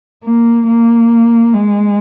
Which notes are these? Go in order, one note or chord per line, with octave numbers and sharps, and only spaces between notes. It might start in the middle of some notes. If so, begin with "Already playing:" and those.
A#3
A#3
G#3